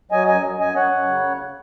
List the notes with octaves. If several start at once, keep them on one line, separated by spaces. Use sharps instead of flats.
F#3 D#5 G#5
F#2 D#5 G#5
F#2
F#2 D#5 G#5
F#2 C#5 F#5
F#2
C#3